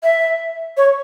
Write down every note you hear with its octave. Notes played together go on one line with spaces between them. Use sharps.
E5
C#5